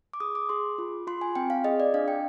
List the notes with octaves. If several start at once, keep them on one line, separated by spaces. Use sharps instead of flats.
D6
G#4 D#6
D6
G#4 C6
F4
F4 C6
G#5
C4 G5
F5
G#4 D#5
D5
D4 F5
G5